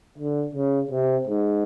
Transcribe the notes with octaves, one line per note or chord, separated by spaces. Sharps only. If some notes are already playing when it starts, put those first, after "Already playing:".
D3
C#3
C3
G#2